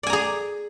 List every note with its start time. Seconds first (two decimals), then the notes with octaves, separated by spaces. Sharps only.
0.03 D5
0.07 G#5
0.10 A#5
0.13 G#4